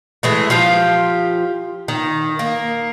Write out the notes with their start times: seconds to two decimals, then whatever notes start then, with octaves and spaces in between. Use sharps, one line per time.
0.23 E3 G#3 A3
0.50 F3 F4 G4
1.88 D#3
2.39 A#3